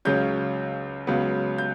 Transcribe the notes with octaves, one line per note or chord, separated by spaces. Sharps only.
C#2 C#3 F#3 C#4 G6
C#2 C#3 F#3 B3
G6